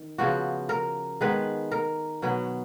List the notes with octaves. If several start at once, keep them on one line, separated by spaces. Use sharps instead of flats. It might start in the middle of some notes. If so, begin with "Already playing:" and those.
Already playing: D#3
C#3 F3 B3 F#4
A#4
D#3 G#3 B3 B4
A#4
B2 F#3 B3